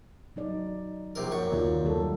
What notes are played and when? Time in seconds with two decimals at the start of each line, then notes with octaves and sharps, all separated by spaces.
0.36 F#3 D#4 D5
1.15 A#1 C3 A#4
1.32 F#2 C#6
1.52 D#2 F4 D5
1.85 D#2 F#3 G3 A4